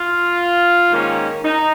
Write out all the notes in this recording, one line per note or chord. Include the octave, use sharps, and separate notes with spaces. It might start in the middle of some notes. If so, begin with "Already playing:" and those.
Already playing: F4
G#2 D#3 A#3 C#4
D#4